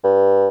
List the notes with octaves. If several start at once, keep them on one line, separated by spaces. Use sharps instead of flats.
G2